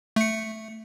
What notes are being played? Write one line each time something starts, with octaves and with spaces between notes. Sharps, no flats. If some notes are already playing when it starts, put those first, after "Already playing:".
A3 C#7